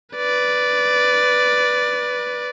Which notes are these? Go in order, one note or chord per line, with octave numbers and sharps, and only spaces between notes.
B4 D5